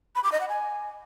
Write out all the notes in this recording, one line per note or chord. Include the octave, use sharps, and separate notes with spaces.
B5
D6
D#5
F#5
G#5